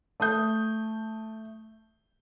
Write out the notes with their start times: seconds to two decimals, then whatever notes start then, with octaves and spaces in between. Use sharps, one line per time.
0.20 A3 D#6 G6